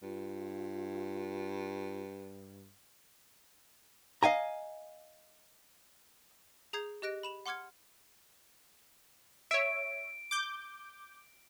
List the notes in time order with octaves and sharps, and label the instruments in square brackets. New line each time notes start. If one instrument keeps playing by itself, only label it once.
[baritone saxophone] G2 [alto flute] F4
[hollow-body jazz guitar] D#5 F5 G#5 A#5
[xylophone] G#4 A#5 D#6 G6 G#6 C7
G4 D#5 F#6 A#6 D7
B5 E7 F7
F#5 C6 D6 F6 G#6 C#7
[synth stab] C#5 E5 [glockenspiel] D7
[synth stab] D6 G6